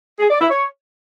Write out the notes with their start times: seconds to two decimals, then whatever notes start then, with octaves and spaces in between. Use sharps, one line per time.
0.20 G#4
0.30 D5
0.40 E4
0.50 C#5